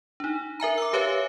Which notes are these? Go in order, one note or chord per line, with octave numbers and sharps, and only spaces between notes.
D4 D#4
A#4 E5 G#5 A#5
D6 E6
G4 B4 C#5 E5 F5 G#5